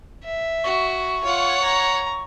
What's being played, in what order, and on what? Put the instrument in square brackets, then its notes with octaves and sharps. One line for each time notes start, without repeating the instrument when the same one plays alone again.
[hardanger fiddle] E5
[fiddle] F#4 [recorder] C#6
[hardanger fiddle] F4 [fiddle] C#5 F#5
[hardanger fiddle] A#5